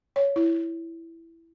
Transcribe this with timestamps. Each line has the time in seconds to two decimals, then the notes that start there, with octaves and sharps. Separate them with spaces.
0.16 C#5
0.36 E4